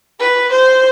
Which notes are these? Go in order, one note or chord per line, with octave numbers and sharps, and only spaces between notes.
B4
C5